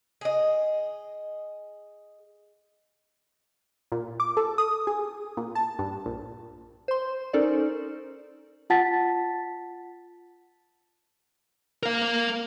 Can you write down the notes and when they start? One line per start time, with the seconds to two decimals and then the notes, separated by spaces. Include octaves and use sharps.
0.21 G#4 D#5
3.92 A#2
4.20 D6
4.37 A4
4.58 D#6
4.87 G#4
5.37 A#2
5.55 A5
5.79 G2
6.06 A#1
6.88 C5 C6
7.33 C#4 D#4 A4 A#4 C5 D5
8.70 F4 F#5 A5 A6 B6
11.83 A#4 F5